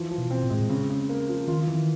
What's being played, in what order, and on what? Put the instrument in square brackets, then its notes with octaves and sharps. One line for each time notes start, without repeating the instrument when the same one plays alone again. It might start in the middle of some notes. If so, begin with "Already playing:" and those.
Already playing: [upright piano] E3 F3
F3
[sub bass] B2
[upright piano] C4
[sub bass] A#2
[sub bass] A2 [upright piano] G#3
[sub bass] A#2
[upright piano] C#3
C#3
A#3
F3
[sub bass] D#3 [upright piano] F4
[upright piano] E3